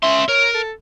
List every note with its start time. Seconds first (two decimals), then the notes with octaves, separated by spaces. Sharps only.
0.03 C#4 E5 C6
0.29 A#4 C#5
0.54 A4